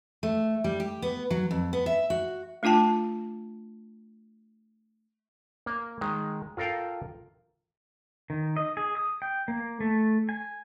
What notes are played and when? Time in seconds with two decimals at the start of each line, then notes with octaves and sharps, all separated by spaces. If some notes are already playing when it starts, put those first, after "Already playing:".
0.23 A3
0.64 G3
0.80 G4
1.02 B3
1.31 F#3
1.51 F2
1.73 B3
1.86 E5
2.10 F#4
2.63 A3 D4 F4 G5 A5
5.66 A#3
6.01 D#3 G#3
6.57 F4 A4 A#4 F5 G5
8.30 D#3
8.57 D#5
8.77 G#4
8.97 D#6
9.22 G5
9.48 A#3
9.80 A3
10.29 G#5